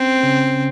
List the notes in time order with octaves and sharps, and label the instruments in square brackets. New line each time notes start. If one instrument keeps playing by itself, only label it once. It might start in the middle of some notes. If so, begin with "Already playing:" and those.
Already playing: [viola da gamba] C4 [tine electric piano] C#4
[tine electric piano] C#3 C#4